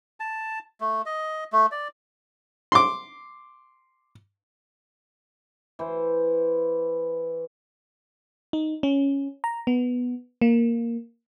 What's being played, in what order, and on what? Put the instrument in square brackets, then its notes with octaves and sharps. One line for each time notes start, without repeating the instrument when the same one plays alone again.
[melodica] A5
A3
D#5
A3
D5
[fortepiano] C6 D6
[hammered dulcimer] E3 C5
[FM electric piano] D#4
C#4
A#5
B3
A#3